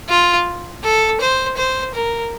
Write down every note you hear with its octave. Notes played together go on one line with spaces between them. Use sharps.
F4
A4
C5
C5
A#4